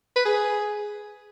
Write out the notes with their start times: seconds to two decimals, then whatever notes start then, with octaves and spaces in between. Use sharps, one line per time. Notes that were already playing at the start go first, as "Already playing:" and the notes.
0.16 B4
0.25 G#4